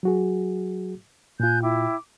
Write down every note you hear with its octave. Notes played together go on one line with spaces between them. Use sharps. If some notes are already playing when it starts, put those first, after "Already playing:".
F#3 F#4 G#4
A#2 F4 G#5 F#6 G6
E4 G5 D6